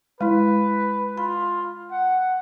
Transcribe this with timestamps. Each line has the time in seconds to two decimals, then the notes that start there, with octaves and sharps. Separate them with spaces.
0.21 G#3 E4 B4
1.17 F4 B5
1.91 F#5